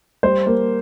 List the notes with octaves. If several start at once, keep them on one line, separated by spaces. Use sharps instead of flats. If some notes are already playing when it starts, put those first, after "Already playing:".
G3 C5
A#3